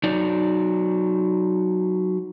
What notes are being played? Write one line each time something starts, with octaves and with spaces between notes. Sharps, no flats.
F#3 D#4 D5